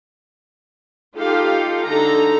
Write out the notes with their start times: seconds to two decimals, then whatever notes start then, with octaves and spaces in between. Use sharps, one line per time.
1.17 D#4 F4 G4 A4 F5
1.87 D3 D#4 A4 A#5